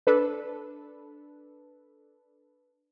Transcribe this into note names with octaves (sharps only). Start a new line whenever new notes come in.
D4 A4 B4